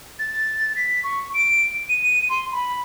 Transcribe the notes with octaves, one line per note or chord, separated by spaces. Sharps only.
A6
B6
C#6
D7
D#7
D#7
C6
B5